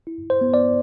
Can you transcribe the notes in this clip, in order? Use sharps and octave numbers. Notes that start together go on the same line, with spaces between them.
E4
C5
B3
D5